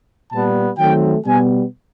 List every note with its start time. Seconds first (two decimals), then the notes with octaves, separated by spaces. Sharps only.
0.31 A#2 G3 B3 A5
0.78 D#3 F#3 A3 C4 G5
1.25 B2 G3 B3 G#5